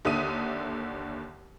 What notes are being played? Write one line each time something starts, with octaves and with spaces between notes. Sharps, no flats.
D#2 D3 E5 D#6 D#7